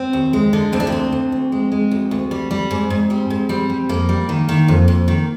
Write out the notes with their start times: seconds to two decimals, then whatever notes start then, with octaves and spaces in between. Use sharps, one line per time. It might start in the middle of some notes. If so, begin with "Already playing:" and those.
Already playing: C4
0.13 D#2
0.33 G#3
0.53 D3
0.73 D2 C4
0.80 D4
0.87 C4
0.92 D3
1.12 D2
1.32 D2
1.52 G#3
1.72 G#3
1.91 D2
2.11 D2
2.31 G3
2.51 G3
2.71 G#2
2.90 G#2
3.10 G3 C4
3.30 G#2
3.49 G3 C4
3.70 G3
3.89 F2 A#3
4.09 G3
4.29 D#3
4.49 D#3
4.68 F2
4.88 F2
5.08 D#3